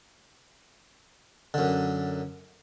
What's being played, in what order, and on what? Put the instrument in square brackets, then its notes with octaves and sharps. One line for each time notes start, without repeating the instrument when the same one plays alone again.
[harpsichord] F#2 D3